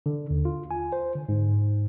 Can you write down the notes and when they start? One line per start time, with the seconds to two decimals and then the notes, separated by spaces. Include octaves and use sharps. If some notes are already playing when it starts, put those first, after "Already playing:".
0.06 D3
0.30 D#2
0.45 F4
0.71 G#5
0.92 C5
1.15 D3
1.29 G#2